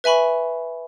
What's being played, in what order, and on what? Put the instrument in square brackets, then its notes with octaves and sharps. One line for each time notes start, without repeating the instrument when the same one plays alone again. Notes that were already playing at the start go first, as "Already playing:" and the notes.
[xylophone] B4 E5 G#5 B5 C#6